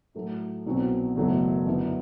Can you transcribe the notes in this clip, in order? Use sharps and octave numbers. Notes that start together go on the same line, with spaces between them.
A2 F#3 A3 E4
C2 B2 F#3 C4 F#4
F#1 E2 B2 F#3 A3
G1 F#2 F#3 B3 E4